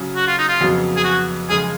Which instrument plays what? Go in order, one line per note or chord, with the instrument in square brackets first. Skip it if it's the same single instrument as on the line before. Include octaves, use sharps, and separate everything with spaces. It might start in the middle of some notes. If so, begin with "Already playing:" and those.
Already playing: [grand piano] C#3 F#3 C#4 G#4
[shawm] F#4
F4
D#4
F4
[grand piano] F2 C#3 F#3 B3 F#4
[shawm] G#4
F#4
[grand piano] F#2 C#3 F3 G#3 [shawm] G#4